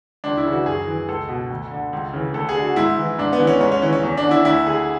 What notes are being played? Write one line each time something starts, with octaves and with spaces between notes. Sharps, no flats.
C#2 D4
E4
C#3 E3
F#4
F#2 G#4
E3
C#2 A4
B2
D2
D3
C#2
C#3 E3
D2 A4
G#4
D3
F#4
G#2 E4
E3
G#2 D4
B3
E3
C#4
G#2 C#4
C#4
E3 C#4
C#4
E2 C#4
D4
D3
E4
D2 E4
D3 G#4